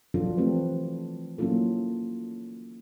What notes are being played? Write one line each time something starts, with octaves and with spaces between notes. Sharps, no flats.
F3 F#3 D4 F4 A4
E3 A3 C4 G4 B4
F#3 A#3 C#4 E4 F4 A4